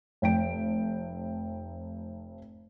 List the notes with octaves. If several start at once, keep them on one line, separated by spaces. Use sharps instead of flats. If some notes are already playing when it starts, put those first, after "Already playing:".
F1 G5 D7